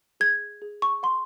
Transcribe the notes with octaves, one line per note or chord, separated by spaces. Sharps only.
G#4 G#6
G#4
C#6
F#5 C6